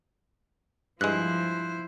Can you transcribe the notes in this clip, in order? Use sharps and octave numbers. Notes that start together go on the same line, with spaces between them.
G2 F3 G#3 E4 C5 F#6